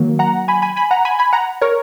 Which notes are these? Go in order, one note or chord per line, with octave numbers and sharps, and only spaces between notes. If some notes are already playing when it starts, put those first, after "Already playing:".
Already playing: D#3 F#3 A#3
F#5 A#5
G#5 B5
G#5 B5
G#5 B5
F#5 A#5
G#5 B5
G#5 B5
F#5 A#5
A#4 C#5